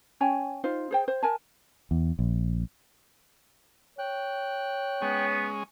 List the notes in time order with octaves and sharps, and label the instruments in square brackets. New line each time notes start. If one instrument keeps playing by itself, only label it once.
[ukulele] C#4 C#5 G5 G#5
D#4 F4 C5
G#4 C5 G5
C5
A#4 G#5 A5
[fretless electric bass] E2
A#1
[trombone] C#5 [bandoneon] G5 F#6
[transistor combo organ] G#3 C#4 [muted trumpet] B3